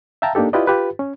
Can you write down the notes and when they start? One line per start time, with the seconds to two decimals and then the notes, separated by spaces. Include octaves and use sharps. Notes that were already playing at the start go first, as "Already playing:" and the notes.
0.22 E5 F5 G5 A5 A#5
0.35 A#3 D4 D#4 G4 A4
0.53 E4 F4 G4 B4 D5 D#5
0.67 F4 G4 B4
0.99 C#4